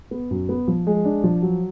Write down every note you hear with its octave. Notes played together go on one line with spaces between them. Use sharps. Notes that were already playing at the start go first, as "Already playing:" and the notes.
B3
F#2
B3
F3
G#3
D4
F3
F#3